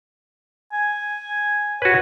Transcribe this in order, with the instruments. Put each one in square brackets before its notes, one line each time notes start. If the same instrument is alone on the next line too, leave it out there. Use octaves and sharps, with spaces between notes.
[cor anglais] G#5
[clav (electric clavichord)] F#4 B4 [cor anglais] C#5